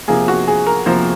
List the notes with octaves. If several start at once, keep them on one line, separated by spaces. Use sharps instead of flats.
C3 F3 A#3 G#4
F#4
G#4
A#4
C3 F3 A#3 C5